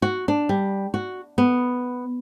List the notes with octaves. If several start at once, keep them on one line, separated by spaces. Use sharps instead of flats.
F#4
D4
G3
F#4
B3